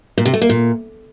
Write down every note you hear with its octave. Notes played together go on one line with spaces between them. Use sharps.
A#2
C3
A3
A#3
A#2